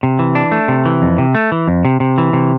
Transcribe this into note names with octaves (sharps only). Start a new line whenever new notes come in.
C3
E3
D4
A3
C3
E3
F2
C3
A3
E3
F2
C3
C3
E3
C3